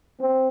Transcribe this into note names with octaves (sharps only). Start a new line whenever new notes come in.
C4